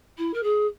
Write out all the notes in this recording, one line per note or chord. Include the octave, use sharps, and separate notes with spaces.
E4
A#4
G#4